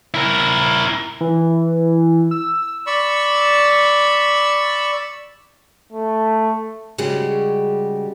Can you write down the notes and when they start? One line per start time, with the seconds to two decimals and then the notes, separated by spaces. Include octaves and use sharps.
0.14 E4 A#4
1.21 E3
2.31 E6
2.87 D5 B5 C#6 E6
5.92 A3
6.98 C#3 G3 G#3 F#4 G4